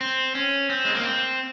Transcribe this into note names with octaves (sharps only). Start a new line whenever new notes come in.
C4
C#4
C4
G#3
A#3
C4